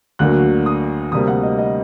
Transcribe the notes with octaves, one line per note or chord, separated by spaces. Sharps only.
D2 D3 F#3 A#3 F#6
D#6
D2 C3 G3 A#3 D#6
F#5
D#5
D#5